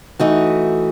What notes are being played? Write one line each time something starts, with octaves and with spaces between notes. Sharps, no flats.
E3 A3 D#4 F#4